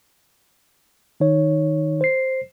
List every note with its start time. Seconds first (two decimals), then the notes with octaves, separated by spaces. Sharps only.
1.20 D#3 D#4 C#5
2.01 C5 C7